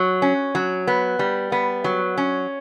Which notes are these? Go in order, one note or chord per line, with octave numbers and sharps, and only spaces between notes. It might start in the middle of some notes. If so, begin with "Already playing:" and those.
Already playing: F#3
C#4
F#3
B3
G3
B3
F#3
C#4